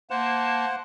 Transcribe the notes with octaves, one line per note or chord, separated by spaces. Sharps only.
A#3 C5 F#5 A5